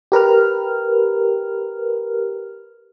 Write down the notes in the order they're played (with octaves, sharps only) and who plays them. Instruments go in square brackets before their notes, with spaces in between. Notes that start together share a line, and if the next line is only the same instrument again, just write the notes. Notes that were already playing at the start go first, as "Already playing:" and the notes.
[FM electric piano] G4 A#4 B4 F6